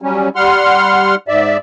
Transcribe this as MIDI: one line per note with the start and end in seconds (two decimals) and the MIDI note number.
0.02 0.29 54
0.02 0.29 55
0.02 0.29 61
0.36 1.15 55
0.36 1.15 78
0.36 1.15 84
0.36 1.15 89
1.28 1.57 44
1.28 1.57 74
1.28 1.57 76